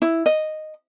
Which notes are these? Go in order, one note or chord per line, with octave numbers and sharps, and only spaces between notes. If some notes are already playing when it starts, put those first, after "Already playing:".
E4
D#5